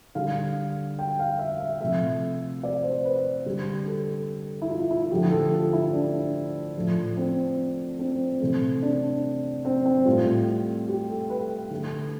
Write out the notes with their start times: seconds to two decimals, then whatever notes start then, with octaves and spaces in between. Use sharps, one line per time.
0.15 D3 G3 F5
0.99 G5
1.19 F5
1.39 E5
1.60 E5
1.80 C3 F3 A3 E5
2.63 D5
2.83 C5
3.05 B4
3.46 D3 G3
3.86 A4
4.62 E4
4.69 F4
4.80 E4
4.91 E4
5.11 D3 F3 A3 G4
5.31 A4
5.52 F4
5.73 E4
5.93 D4
6.76 A2 F3 A3
7.17 C4
7.99 C4
8.40 C3 E3 A3
8.82 D4
9.65 C4
9.86 C4
10.05 A2 G3 F4
10.89 G4
11.10 A4
11.30 B4
11.71 D3 A3